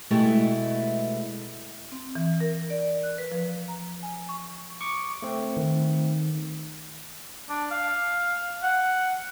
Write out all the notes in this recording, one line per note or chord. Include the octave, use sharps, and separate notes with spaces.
B2 G#3 A3 B3 E4 G4
C4
E3
A#4
D5
F#6
B4
F3
A#5
G#5
C#6
C#6 D6
A3 C4
D#3
D4
F5
F#5